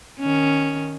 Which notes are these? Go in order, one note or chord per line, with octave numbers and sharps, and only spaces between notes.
D#3 C#4